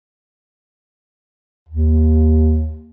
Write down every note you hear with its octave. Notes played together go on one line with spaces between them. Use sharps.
D#2